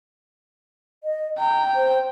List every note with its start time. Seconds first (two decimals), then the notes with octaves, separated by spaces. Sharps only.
1.04 D#5
1.39 G5 A#5
1.75 C5